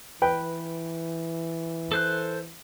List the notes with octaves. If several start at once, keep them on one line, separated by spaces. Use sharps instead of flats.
E3 B4 G5
A4 C5 F#6